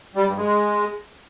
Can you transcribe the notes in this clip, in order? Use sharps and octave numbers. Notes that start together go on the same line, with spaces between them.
G3
G2
G#3